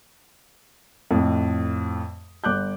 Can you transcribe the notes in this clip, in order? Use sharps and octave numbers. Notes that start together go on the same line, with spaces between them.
F2 A2
G1 D6 F#6 G6